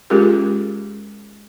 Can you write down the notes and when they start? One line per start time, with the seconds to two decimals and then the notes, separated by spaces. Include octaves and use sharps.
0.10 G#3 C#4 F4 G4 G#4 A#4